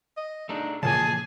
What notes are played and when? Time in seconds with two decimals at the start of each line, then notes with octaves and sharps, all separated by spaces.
0.17 D#5
0.49 A3 D4 D#4 G#4
0.83 A#2 C#3 E3 F3 A#3 G#4 G#5 A5